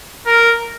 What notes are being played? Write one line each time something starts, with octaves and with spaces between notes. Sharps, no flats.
A#4